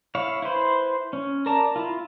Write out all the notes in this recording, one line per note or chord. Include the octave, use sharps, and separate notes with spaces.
E4 C#5 F5
E4 B4 C5
C#4
A#4 D5 A5 A#5
E4 F4